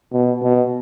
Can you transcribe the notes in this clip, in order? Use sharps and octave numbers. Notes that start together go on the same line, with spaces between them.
B2
B2